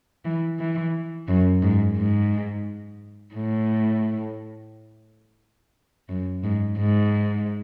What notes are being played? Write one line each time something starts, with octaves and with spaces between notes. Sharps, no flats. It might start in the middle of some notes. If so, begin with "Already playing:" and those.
E3
E3
F#2
G#2
G#2
A2
F#2
G#2
G#2